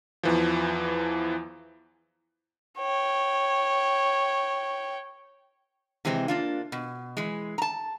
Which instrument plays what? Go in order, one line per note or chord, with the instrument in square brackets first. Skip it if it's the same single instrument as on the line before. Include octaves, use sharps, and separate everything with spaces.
[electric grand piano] E2 E3 F3
[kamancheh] C#5 G5
[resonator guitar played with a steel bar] C3 E3 G#3 C4
A#3 D4 F4
B2
E3 G#3
A5 A#5